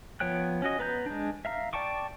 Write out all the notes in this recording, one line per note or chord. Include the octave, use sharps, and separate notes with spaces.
F3 B3 C#5 G5 F#6
C#4 F#4 D#5
B3 B4 A#5 G6
G#3 D4
E5 F5 A#5
D5 G5 A5 C#6 D6